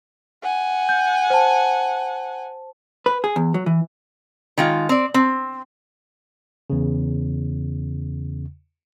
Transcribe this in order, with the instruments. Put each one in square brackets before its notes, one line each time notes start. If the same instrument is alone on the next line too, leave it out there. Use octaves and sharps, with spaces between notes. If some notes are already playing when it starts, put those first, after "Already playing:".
[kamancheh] F#5 G#5
[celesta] G6
C5 A5
[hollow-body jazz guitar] B4
G#4
E2
F#3
E3
[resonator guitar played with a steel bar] D#3 G#3 F4
C4 D5
C4
[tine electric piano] E2 C#3